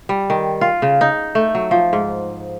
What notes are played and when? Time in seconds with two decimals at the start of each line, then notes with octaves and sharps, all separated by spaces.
0.09 G3
0.30 D#3
0.61 F4
0.82 C#3
1.01 D#4
1.35 A3
1.55 F#3
1.71 F3
1.93 G#2